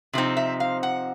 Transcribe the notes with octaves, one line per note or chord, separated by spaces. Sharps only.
C3 F3 C4 D#4
E5
F5
F#5